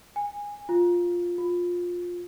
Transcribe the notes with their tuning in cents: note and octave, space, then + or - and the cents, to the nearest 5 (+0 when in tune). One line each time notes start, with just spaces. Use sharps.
G#5 -15
F4 +5
F4 +15